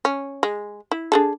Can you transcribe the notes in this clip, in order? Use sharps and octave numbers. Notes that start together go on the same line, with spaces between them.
C#4
G#3
E4
D4 G#4 A4